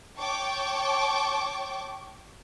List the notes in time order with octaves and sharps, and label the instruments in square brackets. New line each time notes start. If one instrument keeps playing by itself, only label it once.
[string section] C#5 G5 A5 C#6 D6